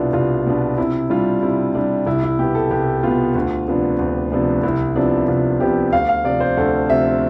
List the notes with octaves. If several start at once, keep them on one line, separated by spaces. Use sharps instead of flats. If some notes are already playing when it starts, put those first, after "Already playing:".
Already playing: C2 B2 B3 D4 E4 F4
C2 F4
B2 B3 D4
C3 E4
G3 D4 F4
C3 E4
G3 D4
C2 E4
E4
B2 B3 G4
A4
C2 G4
B2 B3 F4
D2
C3 F3 B3 D4
D2
C3 F3 B3 D4
C2 E4
C3 F3 B3 D4
C2 F4
C3 F3 B3 G4
D2 F5
F5
C3 F3 D5
C5
D2 A4
C3 F3 E5